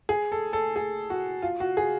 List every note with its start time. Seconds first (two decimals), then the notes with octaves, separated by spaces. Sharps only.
0.09 G#4
0.32 A4
0.53 A4
0.76 G#4
1.10 F#4
1.42 F4
1.60 F#4
1.77 G#4